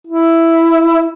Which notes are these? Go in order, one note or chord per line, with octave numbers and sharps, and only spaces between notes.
E4